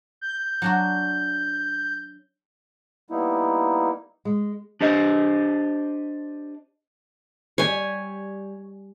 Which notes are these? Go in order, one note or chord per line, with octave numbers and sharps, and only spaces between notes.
G6
F#3 D4 F#4
G3 A#3 B3 D#4 E4
G#3
D4 G4 C5 D#5
G3 C#5 G#5